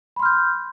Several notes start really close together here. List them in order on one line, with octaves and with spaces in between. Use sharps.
B5 C6 F6 G6